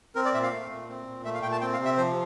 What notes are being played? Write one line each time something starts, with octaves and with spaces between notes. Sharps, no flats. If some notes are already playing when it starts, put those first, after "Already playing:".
C4 A#4
D5
A#2 E5
F5
A3
A#2
C4
A#2
A3 E5
F5
A#2 G5
A5
C4 G5
F5
C3
E5
F3 C5